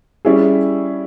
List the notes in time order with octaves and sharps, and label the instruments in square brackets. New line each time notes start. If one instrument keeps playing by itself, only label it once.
[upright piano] G3 C#4 E4 G#4